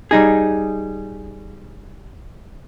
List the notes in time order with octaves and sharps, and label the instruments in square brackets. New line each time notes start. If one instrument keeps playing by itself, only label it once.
[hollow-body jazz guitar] G3 D#4 G#4